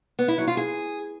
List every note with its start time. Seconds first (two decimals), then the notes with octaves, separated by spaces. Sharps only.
0.19 B3
0.28 E4
0.38 F#3
0.47 F4
0.57 G#4